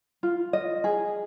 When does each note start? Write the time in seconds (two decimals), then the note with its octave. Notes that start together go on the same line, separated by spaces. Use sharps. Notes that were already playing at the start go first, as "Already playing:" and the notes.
0.23 F4
0.53 D#5
0.84 G#4